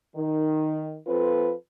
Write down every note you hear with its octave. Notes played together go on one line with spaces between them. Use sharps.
D#3
F3 C4 F4 A4 B4